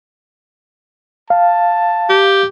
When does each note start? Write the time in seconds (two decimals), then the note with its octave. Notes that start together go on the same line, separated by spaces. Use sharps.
1.30 F5 A5
2.09 G4